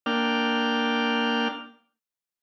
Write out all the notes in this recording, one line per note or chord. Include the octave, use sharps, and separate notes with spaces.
A#3 D4 G5 F6